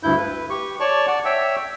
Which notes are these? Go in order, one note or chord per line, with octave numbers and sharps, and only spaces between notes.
D2 G2 E4 G6
B4
G4 C#6
C#5 D5 A5 C#6
D5 F#5 A5
C#5 E5 G5 E6